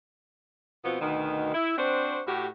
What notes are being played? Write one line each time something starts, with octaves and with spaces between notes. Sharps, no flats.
B2 F3 B3 C4 F4
D2 B2 D#3
E4
C4 D4 F#4 C5
A2 F#4 G4